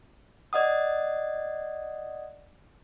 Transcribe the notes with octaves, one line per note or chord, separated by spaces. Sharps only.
D5 D#5 F#5 D#6